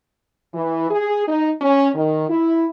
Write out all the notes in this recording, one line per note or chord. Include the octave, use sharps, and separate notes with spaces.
E3
G#4
D#4
C#4
D#3
E4